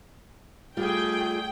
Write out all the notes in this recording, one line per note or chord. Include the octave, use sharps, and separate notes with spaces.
G3 A3 F4 G#4 G5